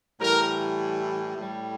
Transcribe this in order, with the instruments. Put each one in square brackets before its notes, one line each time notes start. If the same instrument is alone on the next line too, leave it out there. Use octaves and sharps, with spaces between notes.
[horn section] A2 E3 G3 A#4
A2 G3